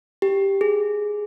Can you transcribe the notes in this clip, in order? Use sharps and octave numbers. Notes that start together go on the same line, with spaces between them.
G4
G#4